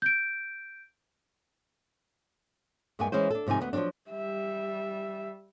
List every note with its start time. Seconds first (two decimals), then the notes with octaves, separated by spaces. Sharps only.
0.02 G6 D7
2.99 E2 G2 G#3 A#3 B3 G#5
3.12 E3 G#3 C#4 E4 C5
3.30 D4 A4
3.47 G#2 C3 F3 D#4 G#5
3.61 D2 B3
3.73 F3 F#3 G#3 C4 D4
4.10 G3 E5